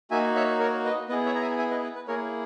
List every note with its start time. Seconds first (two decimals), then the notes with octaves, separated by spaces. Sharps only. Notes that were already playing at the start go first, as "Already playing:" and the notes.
0.11 A#3 D#4 F#4 E5 G#5
0.36 C#5 E5
0.59 A#4 C#5
0.85 B4 D#5
1.09 B3 E4 G#4 B4 D#5
1.26 C#5 E5
1.35 A#5
1.42 E5 G#5
1.58 E5 G#5
1.71 B4 D#5
1.83 B4
1.95 B4
2.08 A#3 E4 G#4 A#4 C#5